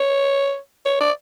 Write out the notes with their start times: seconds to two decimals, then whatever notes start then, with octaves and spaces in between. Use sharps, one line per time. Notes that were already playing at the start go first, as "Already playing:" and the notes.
Already playing: C#5
0.86 C#5
1.01 D5